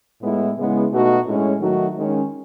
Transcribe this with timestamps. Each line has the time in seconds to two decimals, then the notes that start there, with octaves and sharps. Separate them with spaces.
0.22 A2 G#3 B3 E4
0.57 C#3 G#3 B3 E4
0.91 B2 A3 D#4 F#4
1.26 A2 G#3 C#4
1.60 D#3 F#3 A3 D#4 F#4
1.95 D#3 G#3 C#4